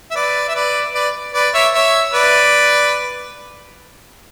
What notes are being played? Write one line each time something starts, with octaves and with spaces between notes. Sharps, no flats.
E5
B4 D5
E5
B4 D5
B4 D5
B4 D5
C#5 E5
C#5 E5
B4 D5